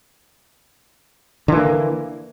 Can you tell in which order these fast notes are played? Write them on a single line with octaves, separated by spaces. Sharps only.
D3 E3 A#3